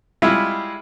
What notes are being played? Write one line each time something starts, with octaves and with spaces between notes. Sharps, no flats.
G3 G#3 E4 F4